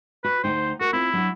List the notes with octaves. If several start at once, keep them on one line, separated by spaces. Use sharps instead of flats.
F#4 B4
D2 D#4 C5 G5
F#4 A#4
C4 E4 F4
F#3 D4 F#4